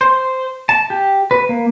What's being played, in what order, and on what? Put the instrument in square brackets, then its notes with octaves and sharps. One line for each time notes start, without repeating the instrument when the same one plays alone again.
[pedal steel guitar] C5
A5
G4
B4
A#3